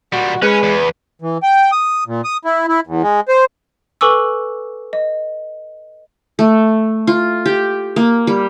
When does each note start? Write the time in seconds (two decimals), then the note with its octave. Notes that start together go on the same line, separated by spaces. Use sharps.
0.13 A#2 G3 F#4
0.42 G#3 C#4 B4 B5
0.63 E2
1.22 E3
1.43 G5
1.72 D#6
2.07 A#2
2.24 D#6
2.45 E4
2.68 E4
2.87 E2
3.02 G#3
3.28 C5
4.01 A4 B4 G#5 C#6 D6 E6
4.93 D#5
6.39 A3
7.07 F4
7.46 G4
7.96 A#3
8.27 G3